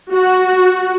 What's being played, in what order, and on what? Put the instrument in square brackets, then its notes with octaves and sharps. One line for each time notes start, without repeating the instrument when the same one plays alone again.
[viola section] F#4